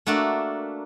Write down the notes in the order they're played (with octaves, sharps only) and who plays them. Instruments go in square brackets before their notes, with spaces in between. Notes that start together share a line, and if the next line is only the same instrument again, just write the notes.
[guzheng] A3 A#3 D4 F#4 A4 A#4